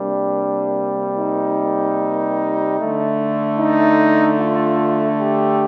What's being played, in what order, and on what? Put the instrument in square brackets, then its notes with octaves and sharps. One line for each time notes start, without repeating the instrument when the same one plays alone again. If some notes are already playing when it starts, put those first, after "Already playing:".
Already playing: [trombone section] C3 G3 A#3 D4
D#4
D3 A3
D#4
F4
G4